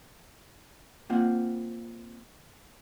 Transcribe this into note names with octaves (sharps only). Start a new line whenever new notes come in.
A#3 C4 F4 F#5